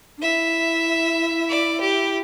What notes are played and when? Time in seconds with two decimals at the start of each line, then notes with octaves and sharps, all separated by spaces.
0.18 D4
0.22 E4 E5
1.49 D5
1.81 G4